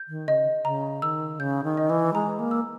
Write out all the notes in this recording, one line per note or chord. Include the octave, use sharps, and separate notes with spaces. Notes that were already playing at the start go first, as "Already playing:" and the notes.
Already playing: G6
D#3
C#3 D#5
C#3 A#5
D#3 E6
C#3 G6
D#3
D#5
E3
G#3 A#5
A#3
E6